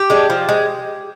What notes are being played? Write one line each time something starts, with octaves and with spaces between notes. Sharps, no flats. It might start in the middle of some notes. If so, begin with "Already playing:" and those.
Already playing: G4
G#3 D4
F3
G#3